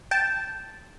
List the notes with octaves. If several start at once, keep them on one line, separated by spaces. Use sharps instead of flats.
G5 A5